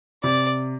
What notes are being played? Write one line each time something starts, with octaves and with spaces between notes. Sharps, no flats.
C3 D5